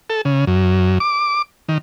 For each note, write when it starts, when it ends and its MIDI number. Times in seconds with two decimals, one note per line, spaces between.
0.10 0.21 69
0.25 0.45 49
0.47 0.98 42
1.00 1.42 86
1.69 1.78 51